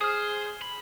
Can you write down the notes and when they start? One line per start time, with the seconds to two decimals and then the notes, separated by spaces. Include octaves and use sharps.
0.01 G#4 C5 D#6 F6
0.62 B5